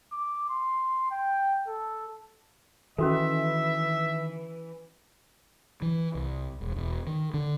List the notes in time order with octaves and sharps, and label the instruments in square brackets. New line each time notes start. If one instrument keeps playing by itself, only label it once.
[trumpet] D6
C6
G5
A4
[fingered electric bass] D#3 [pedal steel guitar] E3 [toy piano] C#4 F#4 A4 [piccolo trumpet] E5
[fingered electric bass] E3
C2
E1
E1
D#3
D3